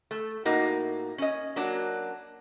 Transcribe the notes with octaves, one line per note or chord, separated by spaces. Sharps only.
A3
A2 A#3 D#4 F#4
C#4 D#5
F#3 A#3 D4 F#4